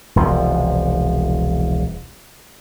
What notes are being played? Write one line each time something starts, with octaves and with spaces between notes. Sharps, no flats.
E1 C2 F3